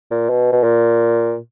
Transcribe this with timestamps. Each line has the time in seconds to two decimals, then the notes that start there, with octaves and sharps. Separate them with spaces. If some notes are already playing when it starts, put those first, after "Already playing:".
0.11 A#2
0.29 B2
0.52 B2
0.64 A#2